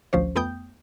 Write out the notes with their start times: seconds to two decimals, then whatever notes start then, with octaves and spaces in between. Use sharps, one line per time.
0.13 A1 D2 F3 C#4 C5
0.35 F2 A3 B3 G5 D#6 G6